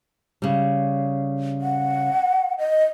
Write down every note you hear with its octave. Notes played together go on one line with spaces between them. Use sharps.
C#3 G3
F#5
D#5